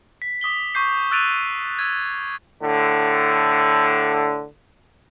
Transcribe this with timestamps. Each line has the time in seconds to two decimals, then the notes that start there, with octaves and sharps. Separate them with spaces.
0.22 B6
0.41 D6 D#6 B6 G7
0.75 C#6 D6 G6 C7
1.11 E6 F#6 A6 D7 D#7 F7
1.77 E6 G#6 D#7
2.63 A2 D3